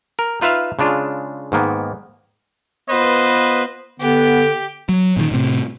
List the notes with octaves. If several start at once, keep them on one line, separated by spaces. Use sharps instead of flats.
A#4
D#4 F4 B4 E5 F5
C#3 G#3 D4 F4
G#2 D#3 A#3 B3
B3 F4 B4 C5 D#5
D3 B3 G4
F#3
A#2 D3 D#3
A2 C3